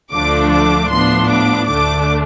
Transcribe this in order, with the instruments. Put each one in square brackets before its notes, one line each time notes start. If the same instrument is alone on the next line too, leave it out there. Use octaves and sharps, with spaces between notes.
[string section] D2 D3 F3 A3 D4 D6
D6
A2 F3 B3 D4 C6
D6
D2 D3 A3 D4 D6